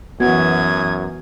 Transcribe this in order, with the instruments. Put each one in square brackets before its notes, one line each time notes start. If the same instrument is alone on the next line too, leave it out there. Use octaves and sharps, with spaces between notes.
[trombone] F#2 [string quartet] E3 D#6 [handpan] B3 F#4 [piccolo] G#6